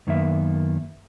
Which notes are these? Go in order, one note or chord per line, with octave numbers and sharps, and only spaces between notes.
F#2 D#3 A#3 B3 E5